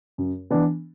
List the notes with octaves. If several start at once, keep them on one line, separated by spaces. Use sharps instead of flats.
F#2
E3 B3 D4